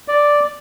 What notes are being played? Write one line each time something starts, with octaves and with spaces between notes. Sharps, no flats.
D5